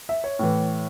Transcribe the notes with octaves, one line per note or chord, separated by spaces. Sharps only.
E5
C#5
A2 E3